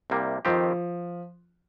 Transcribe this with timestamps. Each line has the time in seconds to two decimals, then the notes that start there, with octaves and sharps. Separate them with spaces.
0.10 C2 C3 G3 A#3
0.45 F2 D#3 F3 C4 G4